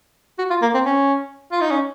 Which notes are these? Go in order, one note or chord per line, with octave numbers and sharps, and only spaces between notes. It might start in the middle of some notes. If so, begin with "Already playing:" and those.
F#4
F4
A#3
C4
C#4
F4
D#4
C#4